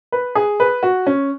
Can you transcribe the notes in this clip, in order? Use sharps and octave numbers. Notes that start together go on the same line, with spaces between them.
B4
G#4
B4
F#4
C#4